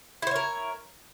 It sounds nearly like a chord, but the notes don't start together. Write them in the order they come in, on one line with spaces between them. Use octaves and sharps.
E4 C5 C#5 A#4